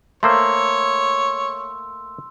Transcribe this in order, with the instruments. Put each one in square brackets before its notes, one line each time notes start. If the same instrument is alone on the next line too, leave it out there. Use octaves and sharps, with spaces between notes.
[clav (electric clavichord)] A3 A#3 C5 [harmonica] C#5 [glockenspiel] C6 E6